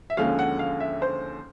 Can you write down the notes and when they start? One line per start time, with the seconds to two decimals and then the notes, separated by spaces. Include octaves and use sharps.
0.10 E5
0.17 D#2 D3 F3 G#3 C#4 F5
0.39 F#5
0.59 F5
0.80 E5
1.02 C5